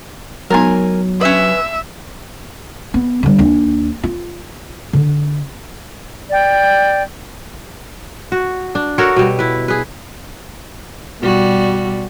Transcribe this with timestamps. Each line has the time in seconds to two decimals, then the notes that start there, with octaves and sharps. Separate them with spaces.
0.50 F#3 G#3 B3 D#4 A#4 G#5
1.21 C#4 B4 E5
2.94 B3
3.23 D3 G3
3.38 D#2 D4
4.03 F4
4.93 D3
6.31 D5 G5
8.32 F#4
8.75 D4
8.98 F#4 A4 A#4 C#5
9.16 B2 G3
9.39 E4 B4
9.68 G#4 B4
11.20 B2 G3 F#4